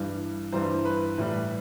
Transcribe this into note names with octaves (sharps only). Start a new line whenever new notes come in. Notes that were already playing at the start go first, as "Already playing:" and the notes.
Already playing: G2 E3 G3
G2 E3 G3 C5
B4
A2 E3 G3